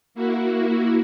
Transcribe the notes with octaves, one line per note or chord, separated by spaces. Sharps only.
A#3 E4 F#4